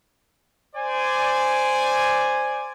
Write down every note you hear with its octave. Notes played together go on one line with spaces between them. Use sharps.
C5 D5 G#5